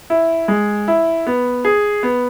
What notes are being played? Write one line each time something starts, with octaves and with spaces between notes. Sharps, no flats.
E4
G#3
E4
B3
G#4
B3